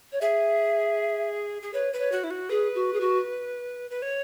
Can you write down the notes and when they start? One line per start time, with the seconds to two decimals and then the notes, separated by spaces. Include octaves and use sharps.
0.12 C#5
0.21 G#4 E5
1.62 G#4
1.73 B4 C#5
1.93 B4
1.99 C#5
2.12 F#4
2.24 E4
2.31 F#4
2.50 G#4 B4
2.75 F#4
2.93 G#4
3.01 F#4
3.90 B4
4.02 C#5